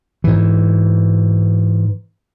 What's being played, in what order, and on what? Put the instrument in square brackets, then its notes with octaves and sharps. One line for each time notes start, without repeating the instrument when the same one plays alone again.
[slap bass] G#2 E3